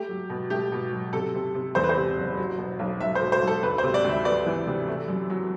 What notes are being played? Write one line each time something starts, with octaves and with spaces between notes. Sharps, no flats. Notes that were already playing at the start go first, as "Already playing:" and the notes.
Already playing: A3 G4
F#3
B2
A3 G4
B2
F#3
C3 A4
C3
C3
E2 C5
B4
C5
C3
F#1
F#3
B2
B1
B1 E5
C5
B2
C5
B1
A4
D2 B4
C5
C3
D5
D2
E5
B3 D5
E3
C3
A3
F#2
F#3